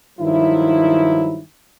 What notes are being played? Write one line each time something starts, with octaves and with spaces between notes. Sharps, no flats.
G2 D#3 F3 F#3 E4